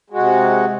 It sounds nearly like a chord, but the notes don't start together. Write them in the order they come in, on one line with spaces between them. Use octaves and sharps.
G#3 F#4 C3